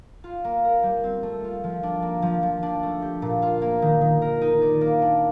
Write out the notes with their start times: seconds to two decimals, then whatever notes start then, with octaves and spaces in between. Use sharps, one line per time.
0.24 F4
0.44 A#3
0.64 A#4
0.83 G3
1.04 C4
1.23 A3
1.44 F4
1.64 F3
1.83 D4
2.02 A#3
2.22 F3
2.43 F3
2.63 D4
2.83 A3
3.02 G4
3.22 A#2
3.42 F4
3.62 A#3
3.82 D#3
4.01 D#3
4.22 A#4
4.41 D#4
4.62 D5
4.81 A#3
5.02 D4